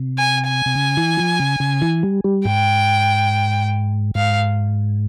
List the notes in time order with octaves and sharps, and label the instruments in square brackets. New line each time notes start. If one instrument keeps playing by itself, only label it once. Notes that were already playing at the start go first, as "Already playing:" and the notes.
Already playing: [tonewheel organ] C3
[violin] G#5
G#5
[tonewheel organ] C3
C#3
E3
F3
C#3
C#3
E3
G3
G3
[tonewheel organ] G#2 [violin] G5
[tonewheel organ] G#2 [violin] F5